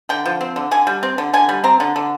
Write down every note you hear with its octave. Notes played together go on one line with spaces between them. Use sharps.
D3 G5
F3
C4
D3
D3 G#5
G3
C4
D3
D3 G#5
G3
C4 A#5
D3
D3